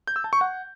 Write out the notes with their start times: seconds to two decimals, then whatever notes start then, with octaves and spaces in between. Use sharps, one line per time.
0.07 G6
0.16 E6
0.24 A5
0.33 C#6
0.41 F#5